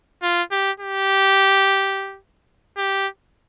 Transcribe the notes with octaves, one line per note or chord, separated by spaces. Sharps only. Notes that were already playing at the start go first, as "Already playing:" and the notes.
F4
G4
G4
G4